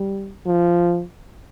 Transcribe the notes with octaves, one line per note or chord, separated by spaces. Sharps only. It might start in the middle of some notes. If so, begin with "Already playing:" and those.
Already playing: G3
F3